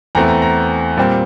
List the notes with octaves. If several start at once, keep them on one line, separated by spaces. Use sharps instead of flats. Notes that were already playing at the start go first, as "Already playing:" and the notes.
E2 E3 A3 C4 A#5
A#5
A#5
A#2 G3 C4